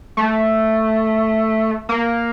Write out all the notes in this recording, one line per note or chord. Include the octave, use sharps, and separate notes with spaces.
A3
A#3